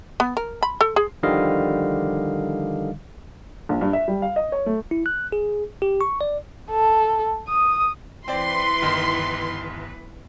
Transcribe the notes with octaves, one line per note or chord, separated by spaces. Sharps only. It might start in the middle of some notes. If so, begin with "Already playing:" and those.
B3
A#4
B5
A4
G#4
D3 D#3 F3 G3 D#5 F5
A#1
G2
E5
G3
F5
D#5
C#5
A3
E4
F#6
G#4
G4
C#6
D5
A4
D#6
E3 C4 B4 D5 C6
G1 D#3